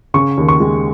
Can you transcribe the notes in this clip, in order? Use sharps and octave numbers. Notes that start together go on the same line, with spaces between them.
C#3 C#6
D#2
C#6
G#3